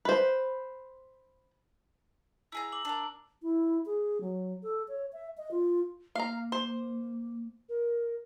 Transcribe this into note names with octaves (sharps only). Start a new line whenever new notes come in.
B4 C5
E4 G#4 A#5 E6
D6 F#7
D4 A#4
E4
G#4
F#3
A4
C#5
E5
D#5
F4
A#3 F5 A#5
C5
A#4